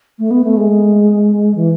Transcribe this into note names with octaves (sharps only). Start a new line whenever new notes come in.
A3
B3
A3
G#3
E3